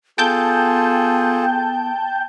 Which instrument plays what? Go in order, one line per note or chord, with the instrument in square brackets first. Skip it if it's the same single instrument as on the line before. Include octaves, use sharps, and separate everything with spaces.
[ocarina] B3 [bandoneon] F4 G#4 A4 [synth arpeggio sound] G5 A5 G6